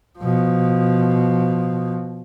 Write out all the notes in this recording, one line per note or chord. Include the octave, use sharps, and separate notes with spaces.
B2 F3